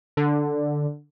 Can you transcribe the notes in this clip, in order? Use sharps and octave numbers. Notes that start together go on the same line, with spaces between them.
D3